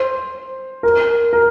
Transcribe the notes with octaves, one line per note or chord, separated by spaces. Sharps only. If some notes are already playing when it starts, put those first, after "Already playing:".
Already playing: C5
A#4
A#4